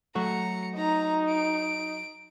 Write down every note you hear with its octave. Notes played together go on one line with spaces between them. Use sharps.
F#3 A3 F#4 A#5 C#7
D#4 A#5
D7